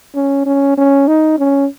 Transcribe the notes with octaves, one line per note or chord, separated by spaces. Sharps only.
C#4
C#4
C#4
D#4
C#4